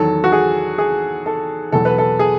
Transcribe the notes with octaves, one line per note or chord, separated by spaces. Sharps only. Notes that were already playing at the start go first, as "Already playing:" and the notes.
Already playing: E2 D#3 F#3 A4
F#4
G#4
G#4
A4
E2 B2 F#3 A4
B4
A4
G#4